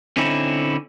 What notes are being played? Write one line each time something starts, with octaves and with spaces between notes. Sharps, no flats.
D3 C4 C#4 D#4 E4